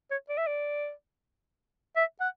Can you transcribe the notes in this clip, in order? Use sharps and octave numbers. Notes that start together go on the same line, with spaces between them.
C#5
D5
E5
D5
E5
F#5